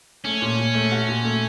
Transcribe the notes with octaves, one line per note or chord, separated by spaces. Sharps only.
A3 C#4
A#2
A#2
A3
F#4
A#2
A3